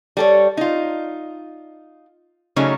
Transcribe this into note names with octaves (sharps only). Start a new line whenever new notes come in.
G3 A4 C#5
D#4 F4
C#3 F#3 A3 C#4 D#4